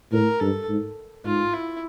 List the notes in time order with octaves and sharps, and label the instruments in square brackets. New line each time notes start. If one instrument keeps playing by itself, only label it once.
[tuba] A2 [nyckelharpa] A#4
[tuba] G2 [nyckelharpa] A4
[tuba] G#2
[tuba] G#2 [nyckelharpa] F4
[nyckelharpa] E4